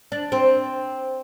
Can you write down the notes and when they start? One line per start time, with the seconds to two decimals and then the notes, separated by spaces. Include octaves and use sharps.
0.12 D4
0.32 C4